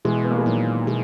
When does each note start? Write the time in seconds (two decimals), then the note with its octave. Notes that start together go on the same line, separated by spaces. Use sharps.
0.05 B2 E3 G#3
0.24 B3
0.31 A#3
0.38 G#3
0.46 A#2 D#3 F#3
0.87 B2 E3 G#3